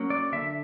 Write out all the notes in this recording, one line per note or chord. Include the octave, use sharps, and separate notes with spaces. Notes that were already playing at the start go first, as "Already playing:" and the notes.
Already playing: F#3 A#3 C#4
D5
D3 E5